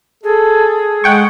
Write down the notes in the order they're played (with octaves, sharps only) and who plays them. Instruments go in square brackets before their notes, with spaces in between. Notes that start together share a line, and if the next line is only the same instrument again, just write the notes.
[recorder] G#4 [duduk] A4
[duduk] G#3 [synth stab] F#5 G5 C#6